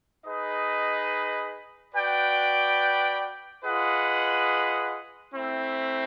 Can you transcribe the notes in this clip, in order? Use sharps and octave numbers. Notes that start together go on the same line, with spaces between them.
D#4 G#4 B4 D#5
F#4 B4 D5 G5
F4 G#4 B4 D#5 F#5
A3 C4 E4